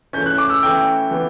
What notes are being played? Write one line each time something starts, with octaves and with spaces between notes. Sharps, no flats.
E3 A3 C#4 G6
F#6
D6
E6
E3 A3 C#4 G5
E3 B3